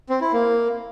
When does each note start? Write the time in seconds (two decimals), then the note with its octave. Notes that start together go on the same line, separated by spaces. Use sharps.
0.10 C4
0.21 E4
0.33 A#3